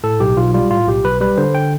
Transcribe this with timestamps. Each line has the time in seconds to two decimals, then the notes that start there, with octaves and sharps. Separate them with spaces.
0.04 A2 A4
0.20 B1 G4
0.37 B1 F4
0.54 G3 F4
0.71 A2 F4
0.88 B1 G4
1.04 B1 B4
1.21 G3 B4
1.37 D3 C5
1.55 G5